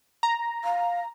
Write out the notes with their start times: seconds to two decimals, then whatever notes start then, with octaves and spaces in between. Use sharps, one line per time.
0.23 A#5
0.64 F5